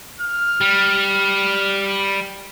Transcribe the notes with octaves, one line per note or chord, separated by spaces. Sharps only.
F6
G3